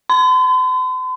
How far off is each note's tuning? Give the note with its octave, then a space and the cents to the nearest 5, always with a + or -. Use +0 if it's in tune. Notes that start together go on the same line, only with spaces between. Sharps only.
C6 -45